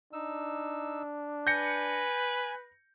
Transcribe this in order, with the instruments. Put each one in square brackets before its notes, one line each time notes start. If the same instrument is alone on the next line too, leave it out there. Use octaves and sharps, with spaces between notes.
[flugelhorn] D4 [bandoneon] D#4 E6
[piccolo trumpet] B4 [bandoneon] G#5 [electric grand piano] G6 A#6 C#7